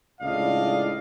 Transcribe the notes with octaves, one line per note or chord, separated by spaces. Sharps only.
C#2 A2 D4 D5 D#5 F5